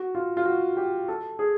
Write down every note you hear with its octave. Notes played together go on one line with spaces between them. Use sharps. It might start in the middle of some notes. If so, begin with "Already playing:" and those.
Already playing: F#4
F4
F4
F#4
G4
A4
G#4